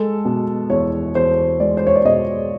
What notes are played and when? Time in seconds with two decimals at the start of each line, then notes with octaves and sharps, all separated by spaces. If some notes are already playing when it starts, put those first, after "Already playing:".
Already playing: G#3 A4
0.25 B2
0.70 E2 C#5
1.15 E2 C5
1.60 G#3 D5
1.77 C5
1.87 C#5
1.96 D5
2.05 B2 D#5